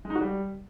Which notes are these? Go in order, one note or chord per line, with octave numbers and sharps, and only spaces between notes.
G#3
D#4
F#4
G3